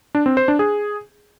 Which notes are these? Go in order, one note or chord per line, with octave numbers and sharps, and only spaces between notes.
D4
C4
C5
D4
G#4